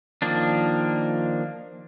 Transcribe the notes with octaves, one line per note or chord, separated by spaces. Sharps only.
D#3 F3 A#3 D4